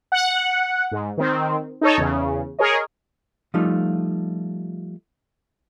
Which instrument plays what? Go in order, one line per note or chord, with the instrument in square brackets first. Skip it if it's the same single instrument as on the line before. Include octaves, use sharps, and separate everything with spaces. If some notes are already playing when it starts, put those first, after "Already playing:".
[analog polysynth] F#5
G#2
D#3 C4
D#4 A4 C#5
E2 C#3
G#4 A#4 C#5 D#5
[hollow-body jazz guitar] F3 G3 A3 D#4 F4